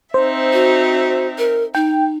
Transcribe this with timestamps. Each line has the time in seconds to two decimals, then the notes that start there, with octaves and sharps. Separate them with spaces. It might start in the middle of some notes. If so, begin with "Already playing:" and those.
0.14 C4 D#4 C5 E5
0.53 F#4
1.38 A#4
1.75 D#4 G5